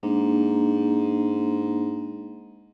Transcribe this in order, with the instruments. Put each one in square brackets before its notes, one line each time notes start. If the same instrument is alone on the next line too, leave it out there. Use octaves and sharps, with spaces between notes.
[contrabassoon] G#2 [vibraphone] A#3 D4